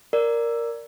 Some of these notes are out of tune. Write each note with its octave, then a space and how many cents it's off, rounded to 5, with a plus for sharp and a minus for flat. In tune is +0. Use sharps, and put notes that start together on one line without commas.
A#4 +0 D5 -5